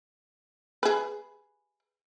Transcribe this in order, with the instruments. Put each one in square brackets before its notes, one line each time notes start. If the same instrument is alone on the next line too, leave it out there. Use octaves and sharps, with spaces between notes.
[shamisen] G#4 B4